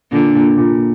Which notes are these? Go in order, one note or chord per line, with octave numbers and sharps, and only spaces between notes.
A#2 D3
A#2
A#2